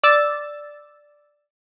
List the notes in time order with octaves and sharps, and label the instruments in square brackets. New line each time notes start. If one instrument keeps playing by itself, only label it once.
[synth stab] D5 E6 A6